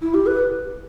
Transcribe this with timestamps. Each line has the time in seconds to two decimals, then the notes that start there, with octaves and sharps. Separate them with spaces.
0.02 E4
0.14 G4
0.26 B4